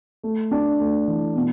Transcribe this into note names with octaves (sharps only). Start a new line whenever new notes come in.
A3
D4
A3
E3
B2